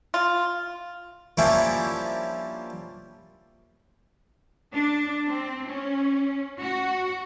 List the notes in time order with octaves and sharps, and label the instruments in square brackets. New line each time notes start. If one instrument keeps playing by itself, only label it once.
[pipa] F4
[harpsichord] F3 G3 A#3 C#4 D4 E4
[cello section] D4
C4
C#4
F#4